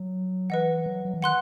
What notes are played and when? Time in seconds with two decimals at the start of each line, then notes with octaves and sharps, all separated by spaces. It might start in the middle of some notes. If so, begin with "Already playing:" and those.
Already playing: F#3
0.50 E3 B4 D#5 F#5
0.86 F#3
1.05 F#3
1.14 E3
1.22 D#3 F#5 C6 F#6